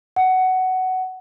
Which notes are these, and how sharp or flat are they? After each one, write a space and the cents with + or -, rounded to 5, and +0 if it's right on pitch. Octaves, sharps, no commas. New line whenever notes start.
F#5 +15